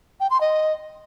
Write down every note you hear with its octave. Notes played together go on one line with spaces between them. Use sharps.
G5
C6
D#5